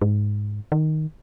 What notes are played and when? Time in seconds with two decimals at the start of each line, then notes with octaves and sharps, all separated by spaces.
0.02 G#2
0.72 D#3